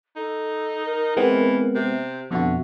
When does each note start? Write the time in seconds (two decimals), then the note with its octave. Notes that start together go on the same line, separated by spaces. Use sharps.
0.16 D#4 A4
0.85 A#4
1.17 E3 G#3 B3 C4
1.75 C3 E5
2.31 F2 B2 D3 F#4 E5